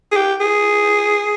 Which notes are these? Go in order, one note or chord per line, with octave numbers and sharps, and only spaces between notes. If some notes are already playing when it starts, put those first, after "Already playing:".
G#4
G4
G#4